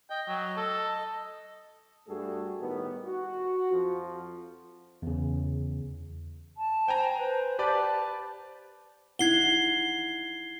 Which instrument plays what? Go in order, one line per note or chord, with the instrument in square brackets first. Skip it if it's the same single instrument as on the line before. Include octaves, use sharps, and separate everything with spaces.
[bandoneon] D#5 [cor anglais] G5
[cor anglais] F#3
A4
[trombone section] G2 G3 A3 F#4 G#4 A4
A2 D#3 G3 B3
F#4
F2 F3
[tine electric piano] E2 C#3
[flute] A5
[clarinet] C5 [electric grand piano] G5 G#5 A#5
[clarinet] B4 [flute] C5
[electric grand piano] G4 B4 D5 [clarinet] A5
[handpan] D#4 E4 F#5 [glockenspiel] G#6 C7 G7